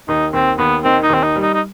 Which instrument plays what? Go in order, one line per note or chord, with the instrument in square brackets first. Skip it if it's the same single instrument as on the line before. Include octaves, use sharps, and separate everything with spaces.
[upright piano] D#2 [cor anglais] D#4
[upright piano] D#2 [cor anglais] C4
[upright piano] D#2 [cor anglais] B3
[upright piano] D#3 [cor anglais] C4
[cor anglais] D#4
[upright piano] D#2 [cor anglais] C4
[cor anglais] D#4
[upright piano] G3
[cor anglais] D#4
D#4